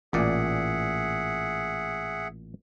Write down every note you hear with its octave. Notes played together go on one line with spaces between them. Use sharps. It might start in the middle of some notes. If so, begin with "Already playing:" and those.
A1 A#2 G#4 D5 E5 F#5